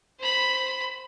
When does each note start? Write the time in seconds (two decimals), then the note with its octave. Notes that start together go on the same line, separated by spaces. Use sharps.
0.19 C5 B5